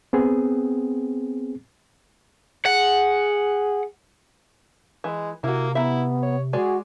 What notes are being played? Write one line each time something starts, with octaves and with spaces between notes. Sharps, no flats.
B3 C4 G#4
G#4 F#5
E3 G#3
C3 A#3 E4 F#4
B3 E4 E5 A#5
C#5
G#3 F#4 G#4 D5